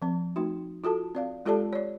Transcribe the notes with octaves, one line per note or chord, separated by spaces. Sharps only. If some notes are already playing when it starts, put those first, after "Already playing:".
F3 C4
A3 D#4 F#4
F4 F#4 A4 A5
C4 D5 F5
G#3 F4 G4 A4 D5 A5
C#5 D5